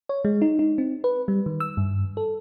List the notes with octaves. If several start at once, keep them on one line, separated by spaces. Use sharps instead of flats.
C#5
G#3
D#4
D#4
C4
B4
G3
D#3
E6
G2
A4